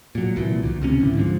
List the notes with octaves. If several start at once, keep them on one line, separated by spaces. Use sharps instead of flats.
A#2 F#3
C2 A#2 E3
D2
C#2 C3 C#4
A1 D3 E3
G#2 D3 F3